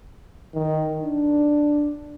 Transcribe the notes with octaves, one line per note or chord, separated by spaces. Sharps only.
D#3
D4